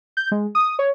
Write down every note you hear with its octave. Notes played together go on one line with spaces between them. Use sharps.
G6
G#3
D#6
C#5